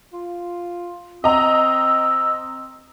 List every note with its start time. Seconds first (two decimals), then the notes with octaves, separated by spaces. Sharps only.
0.13 F4
1.24 C4 D#5 A#5 E6